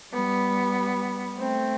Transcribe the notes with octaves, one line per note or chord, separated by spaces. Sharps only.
G3 B3
A3 C4